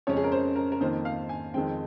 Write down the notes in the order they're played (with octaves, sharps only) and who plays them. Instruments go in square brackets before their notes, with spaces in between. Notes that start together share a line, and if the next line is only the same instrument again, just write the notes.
[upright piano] F2 C#3 G#3 C#4 C#5
G#4
A#4
C5
A#4
A#4
F2 D#3 A#3 C5
F5
G#5
F2 D#3 G#3 C4 G5